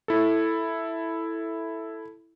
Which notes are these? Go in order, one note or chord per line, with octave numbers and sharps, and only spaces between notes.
E4 A4